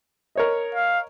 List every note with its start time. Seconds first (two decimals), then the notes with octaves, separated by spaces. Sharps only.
0.35 A#4 C#5 D#5
0.75 F5